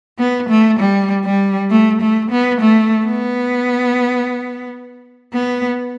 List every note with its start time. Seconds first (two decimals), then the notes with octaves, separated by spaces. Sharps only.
0.19 B3
0.49 A3
0.79 G3
1.25 G3
1.70 A3
2.01 A3
2.31 B3
2.61 A3
3.06 B3
5.34 B3